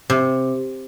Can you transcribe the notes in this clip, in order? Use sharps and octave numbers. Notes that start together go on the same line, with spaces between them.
C3